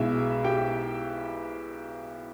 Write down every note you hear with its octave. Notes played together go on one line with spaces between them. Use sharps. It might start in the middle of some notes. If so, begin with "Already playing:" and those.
Already playing: B1 B2 G#3 E4 E5
G4 G5